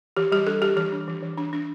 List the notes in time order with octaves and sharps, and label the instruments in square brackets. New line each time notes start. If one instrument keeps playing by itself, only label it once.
[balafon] E3 G4
G3 G4
D4 A4
G3 G4
E3 G4
D4
E3
E3
D4
D4